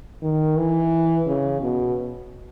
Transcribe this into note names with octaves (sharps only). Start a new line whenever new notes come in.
D#3
E3
C#3
B2